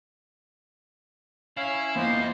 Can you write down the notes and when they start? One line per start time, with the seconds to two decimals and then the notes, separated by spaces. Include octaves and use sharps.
1.57 C#4 E4 F5 C7
1.96 F2 E3 A#3 B3 C5 D#5